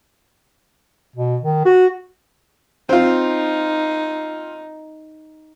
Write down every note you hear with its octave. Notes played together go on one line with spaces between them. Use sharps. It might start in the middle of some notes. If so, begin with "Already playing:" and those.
B2
D#3
F#4
C4 D#4 F4